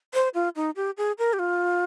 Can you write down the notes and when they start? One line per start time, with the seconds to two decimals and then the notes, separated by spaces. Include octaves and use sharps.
0.14 C5
0.34 F4
0.56 D#4
0.76 G4
0.98 G#4
1.19 A#4
1.33 G4
1.39 F4